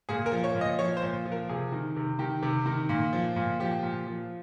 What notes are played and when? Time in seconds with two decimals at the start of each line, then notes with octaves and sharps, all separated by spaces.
0.09 A#2 G#4
0.26 A#4
0.32 F3
0.44 C#5
0.55 A#2
0.61 D#5
0.79 F3 C#5
0.97 C5
1.02 A#2
1.25 F3
1.32 A#4
1.49 C3 G#4
1.72 D#3
1.96 C3
2.19 D#3 G4
2.43 C3
2.66 D#3
2.89 A#2
3.13 F3
3.36 A#2
3.60 F3 G4
3.83 A#2
4.07 F3